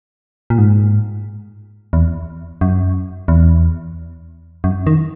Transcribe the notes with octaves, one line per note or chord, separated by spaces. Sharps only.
A#2
G#2
E2
F#2
E2
F#2
D#3